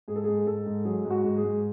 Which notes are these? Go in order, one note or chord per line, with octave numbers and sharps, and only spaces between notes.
G#2 G#4
A4
G#2 G#4
G#2 A4
G#2
F#3 G#4
G#2
F#4
G#2
G#4
G#2